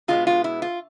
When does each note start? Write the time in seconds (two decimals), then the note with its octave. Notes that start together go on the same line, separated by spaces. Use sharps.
0.08 B2 G#3 B3 F4
0.27 F4
0.44 E4
0.62 F4